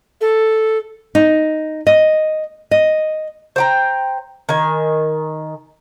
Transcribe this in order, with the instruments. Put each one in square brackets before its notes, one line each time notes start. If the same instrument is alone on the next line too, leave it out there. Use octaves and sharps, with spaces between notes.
[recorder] A4
[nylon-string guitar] D#4
D#5
D#5
[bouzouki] C5 G5 A#5
D#3 G#5